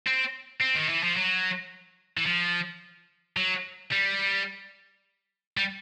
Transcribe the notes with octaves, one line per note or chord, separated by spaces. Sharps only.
C4
C4
D#3
E3
F3
F#3
E3
F3
F#3
G3
G3